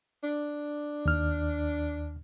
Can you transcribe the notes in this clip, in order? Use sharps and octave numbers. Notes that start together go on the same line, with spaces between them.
D4
D#2 F6